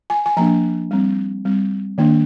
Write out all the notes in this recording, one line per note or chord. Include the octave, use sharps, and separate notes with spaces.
G#5
G#5
F3 A#3 D4 A#5
G3 C4
G3 C4
D#3 A#3 D4